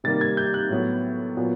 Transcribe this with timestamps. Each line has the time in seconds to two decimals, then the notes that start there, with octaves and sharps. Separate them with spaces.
0.04 C3 D#3 G3 A#3 A6
0.21 G#6
0.37 G6
0.54 F#6
0.70 A2 F#3 B3
1.37 A#2 F#3 B3